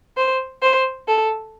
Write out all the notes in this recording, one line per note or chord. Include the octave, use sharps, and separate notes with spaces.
C5
C5
A4